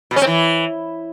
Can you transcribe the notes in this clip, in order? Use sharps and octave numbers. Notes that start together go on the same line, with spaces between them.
B2
C#4
C4
E3